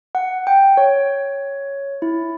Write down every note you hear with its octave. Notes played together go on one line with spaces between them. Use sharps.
F#5
G5
C#5
E4